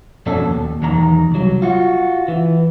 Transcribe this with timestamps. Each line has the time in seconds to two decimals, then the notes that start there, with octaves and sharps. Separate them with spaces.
0.26 F2 B2 C#4 D4 A4
0.42 D#2
0.82 B1 E2 D#3 A#5
1.32 C2 F#3
1.62 F4 F#4
2.28 E3